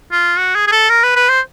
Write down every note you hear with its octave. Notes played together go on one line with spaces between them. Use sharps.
F4
F#4
G#4
G#4
A4
A#4
B4
B4
C5